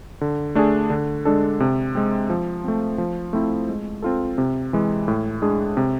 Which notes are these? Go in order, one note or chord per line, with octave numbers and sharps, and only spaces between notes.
D3
A3 D4 G#4
D3
G#3 D4 A4
C3
G#3 C4
F3
A3 C4
F3
A3 C4 E4
G#3
C4 F4 A4
C3
E3 G#3
A2
G#3 D4 G#4
C3